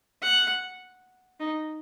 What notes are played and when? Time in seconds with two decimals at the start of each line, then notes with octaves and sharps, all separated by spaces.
0.22 F#5
1.40 D#4